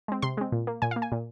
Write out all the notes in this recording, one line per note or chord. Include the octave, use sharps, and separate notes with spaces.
G#3 C4
C3 C6
G#3 C4
A#2
A#3
A#2 G#5
F5
A#3
G#5
A#2